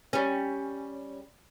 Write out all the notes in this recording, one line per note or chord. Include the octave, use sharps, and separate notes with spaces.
G3 C#4